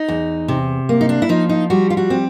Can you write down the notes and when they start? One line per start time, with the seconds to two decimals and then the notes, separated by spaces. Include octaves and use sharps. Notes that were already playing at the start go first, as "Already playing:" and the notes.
Already playing: D#4
0.08 E2
0.48 C3
0.89 A#3
1.01 D#4
1.09 D4
1.22 E4
1.29 F3 D#4
1.49 D#4
1.70 G3 F#4
1.90 F4
1.97 F#4
2.10 C4